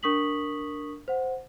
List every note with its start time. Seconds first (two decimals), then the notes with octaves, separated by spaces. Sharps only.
0.03 D4 A#4 C#6 D#6 B6 F#7
1.08 C5 F#5